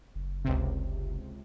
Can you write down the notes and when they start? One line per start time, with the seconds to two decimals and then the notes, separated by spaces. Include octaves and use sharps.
0.15 F#1
0.45 C#2 C3